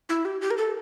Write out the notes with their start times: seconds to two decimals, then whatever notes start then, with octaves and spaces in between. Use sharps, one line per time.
0.09 E4
0.25 G4
0.41 G4
0.51 A#4
0.58 A4